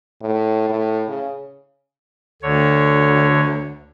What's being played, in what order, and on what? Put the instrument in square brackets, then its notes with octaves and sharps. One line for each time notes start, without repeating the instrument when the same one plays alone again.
[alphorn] A2
A2
C#3
[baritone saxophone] D2 [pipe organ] D3 C#5